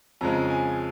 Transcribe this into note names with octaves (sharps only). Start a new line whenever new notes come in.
F2 C#3 F3 G#3 A#5
G#5